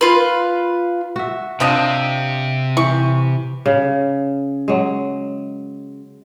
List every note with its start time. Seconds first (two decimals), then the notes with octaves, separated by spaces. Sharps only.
0.01 F4 B4
1.16 F#4 E5
1.60 C3 F3 D4 D#5
2.77 E3 C#6
3.66 C#3
4.68 F#3 G#3